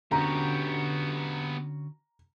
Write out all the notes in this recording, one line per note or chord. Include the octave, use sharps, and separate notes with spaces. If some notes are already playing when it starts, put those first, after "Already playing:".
D3 B3 C#4 F#4 G4 A#5